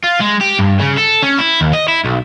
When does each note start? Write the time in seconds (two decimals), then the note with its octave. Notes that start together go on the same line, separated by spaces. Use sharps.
0.04 F4
0.20 G#3
0.41 G4
0.59 G2
0.80 C#3
0.97 A4
1.23 C#4
1.39 E4
1.61 D#2
1.73 D#5
1.88 E4
2.04 B1